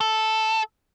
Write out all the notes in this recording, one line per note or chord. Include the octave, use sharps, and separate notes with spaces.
A4